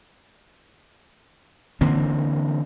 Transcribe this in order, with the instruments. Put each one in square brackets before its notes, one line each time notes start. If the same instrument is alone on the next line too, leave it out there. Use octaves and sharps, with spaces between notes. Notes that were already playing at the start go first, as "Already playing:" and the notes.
[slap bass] D3 E3 A#3 C4